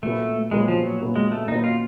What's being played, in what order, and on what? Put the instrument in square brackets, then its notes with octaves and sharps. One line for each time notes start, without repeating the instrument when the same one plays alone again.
[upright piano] A#2 F#3 B3 [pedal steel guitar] A3
[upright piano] A#2 F#3 B3 [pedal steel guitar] G#3
[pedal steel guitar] F3
F#3
[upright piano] A#2 F#3 B3
[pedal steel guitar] G#3
A3
[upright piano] A#2 F#3 B3 [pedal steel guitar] D#4
[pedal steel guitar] F4